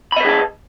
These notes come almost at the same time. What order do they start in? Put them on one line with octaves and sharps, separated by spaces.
B5 D#5 B4 G#4 A5